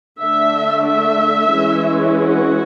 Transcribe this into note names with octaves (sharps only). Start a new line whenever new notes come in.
D3 A3 D4 E5
E5
E3 G#3 C#4
F#4